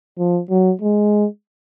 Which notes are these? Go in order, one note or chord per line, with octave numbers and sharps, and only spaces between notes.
F3
F#3
G#3